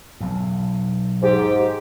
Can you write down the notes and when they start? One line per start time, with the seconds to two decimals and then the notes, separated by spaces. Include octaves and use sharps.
0.21 B1 E2
1.23 G#2 G4